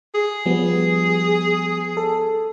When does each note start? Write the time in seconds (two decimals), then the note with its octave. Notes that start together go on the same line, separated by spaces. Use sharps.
0.14 G#4
0.46 F3 G3 B3
1.97 A4